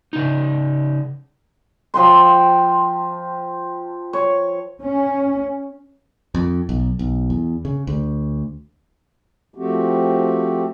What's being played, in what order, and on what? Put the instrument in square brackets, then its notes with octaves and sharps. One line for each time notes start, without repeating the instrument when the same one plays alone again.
[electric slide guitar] C#3 D#4
[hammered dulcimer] F3 G5 C6
C#5
[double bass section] C#4
[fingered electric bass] F2
B1
B1
E2
C#3
D2
[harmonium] F3 A3 C4 F#4 G4